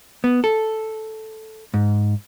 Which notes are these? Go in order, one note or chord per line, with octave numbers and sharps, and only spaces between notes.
B3
A4
G#2